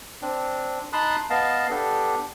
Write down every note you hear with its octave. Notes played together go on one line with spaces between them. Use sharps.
C4 D4
D#4 A5 B5 C6 D#6 F#6
B3 D#5 F5 A5
B3 D4 G4 A4